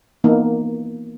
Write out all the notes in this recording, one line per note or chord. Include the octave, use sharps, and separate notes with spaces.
E3 A#3 B3 D#4